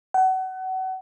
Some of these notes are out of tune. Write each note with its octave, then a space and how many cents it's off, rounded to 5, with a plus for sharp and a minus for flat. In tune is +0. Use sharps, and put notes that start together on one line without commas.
F#5 +30